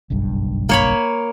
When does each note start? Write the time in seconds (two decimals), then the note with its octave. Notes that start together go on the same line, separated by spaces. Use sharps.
0.10 F#1 B1 G2
0.69 A#3 C#5 B5